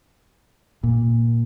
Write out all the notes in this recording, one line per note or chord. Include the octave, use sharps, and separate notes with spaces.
A#2